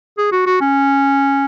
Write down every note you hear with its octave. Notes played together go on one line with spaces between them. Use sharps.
G#4
F#4
F#4
C#4